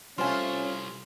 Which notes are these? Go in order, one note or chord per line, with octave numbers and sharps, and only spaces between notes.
C3 G3 A3 C#4 F4 C5 G#5